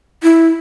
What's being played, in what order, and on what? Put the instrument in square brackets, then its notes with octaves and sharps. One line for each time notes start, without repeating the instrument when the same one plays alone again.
[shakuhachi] E4